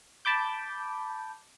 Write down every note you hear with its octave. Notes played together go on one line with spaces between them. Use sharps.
A5 B5 D6 G6